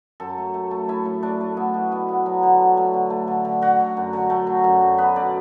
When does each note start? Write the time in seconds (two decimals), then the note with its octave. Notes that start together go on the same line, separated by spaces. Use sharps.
0.20 F#2 A4
0.38 A3
0.54 A3
0.71 A3
0.88 A3 E4
1.05 A2
1.23 A3 D4
1.40 A3
1.57 B3 E4
1.74 B2
1.92 B3
2.09 B3
2.26 F#3
2.43 D3
2.59 D3
2.77 A3
2.94 D3
3.10 A3
3.28 D3
3.45 D3
3.62 D3 F#4
3.80 D3
3.97 F#2
4.13 D3
4.30 A3
4.47 F#3
4.64 F#2
4.81 F#2
4.98 B3 B4
5.16 B2 D5